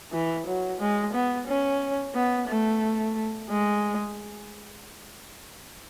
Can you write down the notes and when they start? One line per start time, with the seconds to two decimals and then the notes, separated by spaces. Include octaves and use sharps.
0.12 E3
0.46 F#3
0.80 G#3
1.13 B3
1.47 C#4
2.15 B3
2.48 A3
3.49 G#3